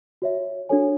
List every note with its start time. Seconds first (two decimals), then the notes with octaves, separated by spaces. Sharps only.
0.22 F#4 C#5 E5
0.69 D4 F#4 A4 C#5 G#5